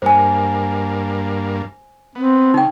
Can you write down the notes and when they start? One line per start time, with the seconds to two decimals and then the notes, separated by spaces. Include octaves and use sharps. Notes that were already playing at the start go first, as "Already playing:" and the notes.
0.02 G2 A#3 C5 G#5
2.15 B3 C4
2.54 C#3 D#4 G5